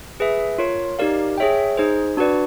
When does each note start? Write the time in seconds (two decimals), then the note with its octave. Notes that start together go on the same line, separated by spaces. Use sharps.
0.20 G#4 B4 E5
0.58 F4 A#4 C#5
0.99 D#4 G4 A#4 D5 F5
1.38 G#4 C#5 E5 G5
1.77 D#4 G#4 C5
2.17 D4 F#4 B4 D5